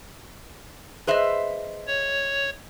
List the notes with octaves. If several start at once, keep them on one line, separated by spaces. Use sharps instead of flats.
G#4 B4 C5 D#5 E5
C#5